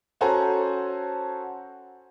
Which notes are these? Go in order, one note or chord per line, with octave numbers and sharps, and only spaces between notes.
C#4 F#4 A4 C5 G#5 A#5